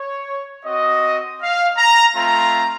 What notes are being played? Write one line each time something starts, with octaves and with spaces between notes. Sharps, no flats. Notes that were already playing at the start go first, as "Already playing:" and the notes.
Already playing: C#5
C4 F#4 D#5
F5
A#5
A3 C4 F4 A#5